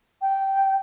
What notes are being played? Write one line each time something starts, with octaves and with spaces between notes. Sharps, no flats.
G5